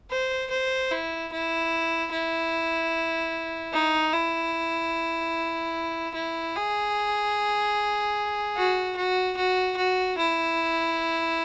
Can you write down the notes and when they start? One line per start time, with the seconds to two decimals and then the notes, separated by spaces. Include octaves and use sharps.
0.11 C5
0.50 C5
0.92 E4
1.32 E4
2.12 E4
3.73 D#4
4.13 E4
6.15 E4
6.55 G#4
8.57 F#4
8.96 F#4
9.37 F#4
9.77 F#4
10.18 E4